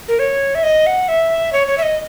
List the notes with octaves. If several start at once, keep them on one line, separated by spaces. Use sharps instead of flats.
A#4
C#5
E5
D#5
F#5
E5
C#5
C#5
E5
D#5